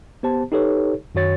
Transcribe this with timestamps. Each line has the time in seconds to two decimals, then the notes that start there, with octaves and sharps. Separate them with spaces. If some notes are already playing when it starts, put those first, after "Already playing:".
0.23 B3 G4 C5 A5
0.52 D#4 G4 A4 B4 C#5
1.15 F#2 D#3 F#4 C#5 A6